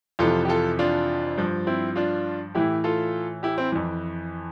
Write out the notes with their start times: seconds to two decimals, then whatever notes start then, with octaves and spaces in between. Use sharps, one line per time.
0.19 F2 C3 E3 F4 A4
0.45 G4
0.48 F4 A4
0.79 D4 F4
1.38 G2 F3
1.67 C4 E4
1.96 D4 F4
2.55 A2 E3 E4 G4
2.84 F4 A4
3.43 E4 G4
3.58 C4 E4
3.72 F2 E3